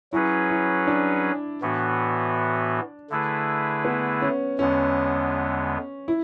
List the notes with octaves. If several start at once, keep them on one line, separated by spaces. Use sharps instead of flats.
F#3 C#4 E4 G#4 B4
E4
D4
A2 E3 B3 F#4
D3 A3 E4 G#4 B4
B3
C#4
E2 D3 G#3 B3 C#4
E4